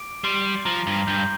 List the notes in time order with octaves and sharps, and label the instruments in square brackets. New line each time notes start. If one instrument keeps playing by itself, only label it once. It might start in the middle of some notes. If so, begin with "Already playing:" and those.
Already playing: [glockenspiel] D6 D7
[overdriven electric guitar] G3 [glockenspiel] C6 C7
[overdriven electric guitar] F3 [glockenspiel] A#5 A#6
[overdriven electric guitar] G2
[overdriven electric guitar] G2 [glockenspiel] G6